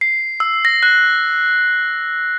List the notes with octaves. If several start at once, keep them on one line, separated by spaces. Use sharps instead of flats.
C7
E6
A#6
F#6